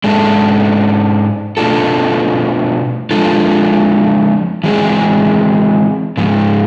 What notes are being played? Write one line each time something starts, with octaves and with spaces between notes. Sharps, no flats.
G#2 G#3 D4 A4
B2 A3 D4 F4 A4
F3 G#3 D4 F4 A4
E3 G#3 C4 G#4
G#2 F3 G#3